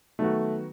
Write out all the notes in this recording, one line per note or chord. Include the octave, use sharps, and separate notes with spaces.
D#3 F#3 A3 B3 F#4